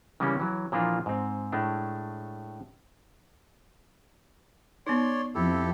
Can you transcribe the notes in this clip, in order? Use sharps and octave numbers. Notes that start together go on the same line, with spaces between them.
C#3 E3 G3 A#3 C#4
E3 F#3
A#2 E3 F3 A#3 D4 F4
G#2 C4
A2 G#3 A3 D4
B3 D#4 C#5 D5 C6
F2 E4 G4 A4